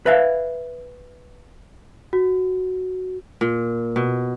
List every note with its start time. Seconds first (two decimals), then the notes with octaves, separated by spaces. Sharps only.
0.06 B4 E5 F5
2.13 F#4
3.41 A#2
3.96 B2